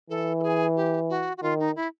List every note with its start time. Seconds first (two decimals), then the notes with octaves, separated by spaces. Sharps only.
0.10 E3 A4
0.39 A4
0.43 G#4
0.76 G4
1.10 F#4
1.37 F#4
1.42 D#3 F4
1.60 D#4
1.76 E4